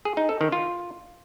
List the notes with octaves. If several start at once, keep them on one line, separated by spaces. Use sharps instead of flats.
G#4
D#4
A4
D#3
F4